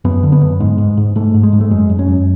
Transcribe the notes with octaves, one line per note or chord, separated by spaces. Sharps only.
F#2 B3
D3
B3
F#2
G#2 G#3
G#2
G#2
G#2 A3
G#2
G#3
G#2
A3
F#2 G#3
F#2
C#4
F#2